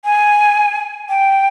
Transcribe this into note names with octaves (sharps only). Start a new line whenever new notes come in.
G#5
G5